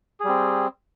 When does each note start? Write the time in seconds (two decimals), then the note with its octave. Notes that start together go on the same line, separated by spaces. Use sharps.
0.20 G#4
0.25 G3
0.29 C4